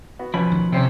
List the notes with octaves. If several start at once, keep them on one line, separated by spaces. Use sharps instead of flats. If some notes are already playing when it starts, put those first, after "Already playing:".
B3 F#4
B2 F3 C#4 B5
D#3
C3 C#4 C5 G5